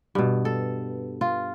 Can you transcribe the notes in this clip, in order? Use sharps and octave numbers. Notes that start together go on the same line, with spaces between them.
G2 B2
A4
F4